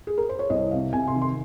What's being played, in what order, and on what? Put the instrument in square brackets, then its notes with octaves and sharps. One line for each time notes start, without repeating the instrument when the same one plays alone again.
[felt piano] G#4
A#4
C5
C#5
C2 D#5
C3 F5
C3 G#5
C6
D#3
C6